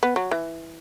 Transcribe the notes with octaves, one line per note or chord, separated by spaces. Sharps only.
B3
F#3
E3